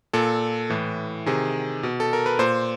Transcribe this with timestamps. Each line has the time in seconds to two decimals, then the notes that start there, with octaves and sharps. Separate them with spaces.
0.13 A#2 A4
0.70 A2 E3
1.26 C3 D#3 G#4
1.83 B2
2.00 A4
2.13 A#4
2.26 B4
2.39 A#2 C5